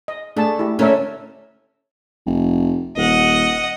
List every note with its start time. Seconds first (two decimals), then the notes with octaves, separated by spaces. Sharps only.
0.08 D#5
0.37 A3 D4 G#4 A5
0.59 E4 G4
0.79 D3 A3 C#4 D4 A#4 E5
2.26 F1
2.97 D#1 D#5 F#5